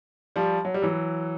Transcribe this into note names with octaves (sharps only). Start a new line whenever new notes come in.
F3 G3
F#3
G3
E3 F#3